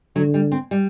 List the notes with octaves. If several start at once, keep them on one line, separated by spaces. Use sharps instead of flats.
D3 F#3
G3
C4
G3